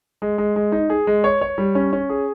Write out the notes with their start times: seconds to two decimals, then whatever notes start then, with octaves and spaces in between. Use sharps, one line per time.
0.22 G#3
0.38 G#3
0.56 G#3
0.72 D#4
0.90 G#4
1.07 G#3
1.24 C#5
1.41 C#5
1.58 G3
1.75 C#4
1.93 C#4
2.10 G#4